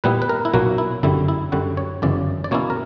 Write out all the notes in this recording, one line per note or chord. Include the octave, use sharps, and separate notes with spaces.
A#2 G3 B3 E4 B4
B4
A#4
E4
B1 A#2 F#3 A#3 F#4
E4
G1 F#2 D3 G3 E4
E4
F#2 D3 G3 F#4
C#5
G1 F#2 C#3 E3 D5
D5
B2 A#3 C#4 E4 C#5
A#4